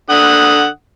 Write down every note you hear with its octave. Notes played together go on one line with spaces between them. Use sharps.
D3 F#5 D#6